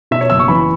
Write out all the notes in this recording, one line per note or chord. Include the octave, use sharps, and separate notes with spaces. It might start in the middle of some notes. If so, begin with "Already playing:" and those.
B2 E5
C#5
F#1 E6
C#6
E3 B5